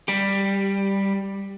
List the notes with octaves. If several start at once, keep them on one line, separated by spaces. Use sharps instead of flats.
G3 G4